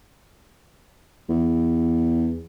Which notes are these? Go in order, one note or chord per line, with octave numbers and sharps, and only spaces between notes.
E2